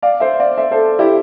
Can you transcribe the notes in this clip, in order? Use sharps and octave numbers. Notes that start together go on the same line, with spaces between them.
D5 F5
C5 E5
D5 F5
C5 E5
A4 C5
E4 G4